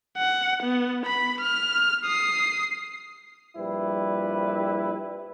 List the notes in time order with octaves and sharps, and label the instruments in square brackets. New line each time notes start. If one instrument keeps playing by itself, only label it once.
[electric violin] F#5
B3
B5
F6
D#6 C7
[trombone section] A#1 G3 E4 B4